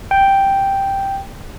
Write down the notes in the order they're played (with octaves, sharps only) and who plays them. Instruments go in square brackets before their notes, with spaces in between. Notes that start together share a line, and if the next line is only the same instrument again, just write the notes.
[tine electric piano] G5